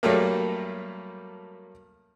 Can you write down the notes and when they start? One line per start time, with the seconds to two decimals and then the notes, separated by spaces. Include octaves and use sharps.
0.03 G2 F#3 G3 A3 A#3